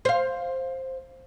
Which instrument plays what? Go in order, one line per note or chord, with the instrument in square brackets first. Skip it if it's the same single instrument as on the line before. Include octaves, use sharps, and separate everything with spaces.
[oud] C5 F5